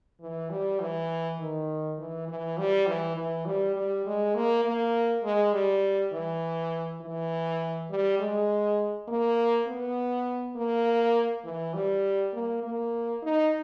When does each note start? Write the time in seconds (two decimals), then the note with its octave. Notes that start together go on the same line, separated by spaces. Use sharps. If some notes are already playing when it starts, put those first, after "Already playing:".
0.21 E3
0.50 G3
0.80 E3
1.39 D#3
1.98 E3
2.28 E3
2.58 G3
2.87 E3
3.17 E3
3.46 G3
3.76 G3
4.06 G#3
4.35 A#3
4.65 A#3
5.24 G#3
5.53 G3
6.13 E3
7.01 E3
7.90 G3
8.19 G#3
9.08 A#3
9.67 B3
10.56 A#3
11.44 E3
11.74 G3
12.33 A#3
12.63 A#3
13.23 D#4